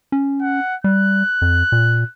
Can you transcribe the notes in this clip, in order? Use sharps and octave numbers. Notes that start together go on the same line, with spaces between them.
C#4
F#5
G3 F#6
F2
A#2